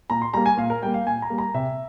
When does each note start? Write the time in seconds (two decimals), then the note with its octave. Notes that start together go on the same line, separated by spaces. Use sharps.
0.10 A#2 A#5
0.22 C6
0.34 G3 A#3 A#5
0.46 G#5
0.57 A#2 F5
0.70 A#4
0.82 G3 G5
0.86 A#3
0.94 F5
1.06 A#2 G#5
1.22 A#5
1.30 G3 A#3
1.38 A#5
1.54 C3 E5